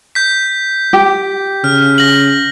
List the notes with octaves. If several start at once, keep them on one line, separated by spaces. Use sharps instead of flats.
G6 B6
G4
C#3 F6
A#6 F#7